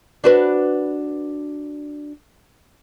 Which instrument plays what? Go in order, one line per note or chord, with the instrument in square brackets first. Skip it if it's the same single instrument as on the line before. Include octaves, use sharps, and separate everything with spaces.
[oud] D4 F#4 B4